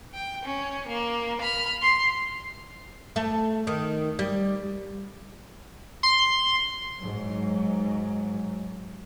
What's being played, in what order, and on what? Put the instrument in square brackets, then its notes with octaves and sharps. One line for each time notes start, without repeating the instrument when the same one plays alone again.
[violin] G5
C#4
A#3
B5 F6
C6
[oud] A3
D#3
G3
[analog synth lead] C6
[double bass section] G#2 F#3